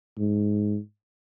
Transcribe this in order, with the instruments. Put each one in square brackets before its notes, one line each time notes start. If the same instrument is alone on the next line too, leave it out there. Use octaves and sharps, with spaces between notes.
[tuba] G#2